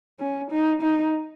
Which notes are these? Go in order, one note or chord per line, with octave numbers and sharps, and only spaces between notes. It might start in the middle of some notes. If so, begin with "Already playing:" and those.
C#4
D#4
D#4